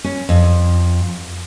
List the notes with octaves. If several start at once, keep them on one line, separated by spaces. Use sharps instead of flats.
C#4
F2